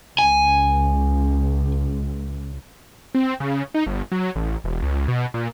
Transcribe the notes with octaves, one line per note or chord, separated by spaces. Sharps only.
C#2 G#5
C4
C#3
D#4
G1
F#3
A1
E1
C#2
B2
A#2